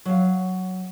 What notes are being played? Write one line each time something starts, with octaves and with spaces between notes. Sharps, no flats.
F#3 F5